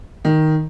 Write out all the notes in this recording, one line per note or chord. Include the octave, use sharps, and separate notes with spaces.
D#3